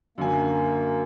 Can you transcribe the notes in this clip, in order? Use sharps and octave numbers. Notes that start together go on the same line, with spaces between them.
F#2 D3 A#3 G#5